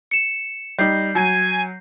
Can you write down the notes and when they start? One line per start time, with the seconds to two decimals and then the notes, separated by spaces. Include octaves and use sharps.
0.11 C#7 E7
0.79 G3 D#4 G6 C7
1.15 F#3 G#5